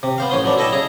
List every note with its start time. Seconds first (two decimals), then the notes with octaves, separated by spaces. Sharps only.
0.03 C3
0.18 B3 C5 F5
0.30 A1 C#4 C5 C6 D#6
0.44 F#3 B3 D4
0.58 E4 A4 D#5 E5 G5 A5
0.72 C#3 G#4 A#5